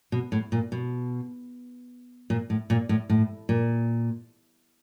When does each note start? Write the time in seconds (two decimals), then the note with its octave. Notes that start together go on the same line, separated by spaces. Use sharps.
0.12 B2
0.32 A2
0.52 A#2
0.72 B2
2.30 A#2
2.50 A2
2.70 A#2
2.89 A2
3.10 A2
3.49 A#2